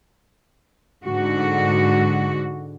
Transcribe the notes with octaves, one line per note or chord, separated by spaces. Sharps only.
G#2 D3 F#4